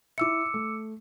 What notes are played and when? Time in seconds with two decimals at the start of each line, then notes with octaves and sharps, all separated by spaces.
0.18 E4 E5 D6 E6 C#7
0.54 A3